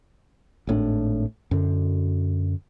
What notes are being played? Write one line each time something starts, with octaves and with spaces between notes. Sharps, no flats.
G#1 A2 C#4 D4
F#2 D3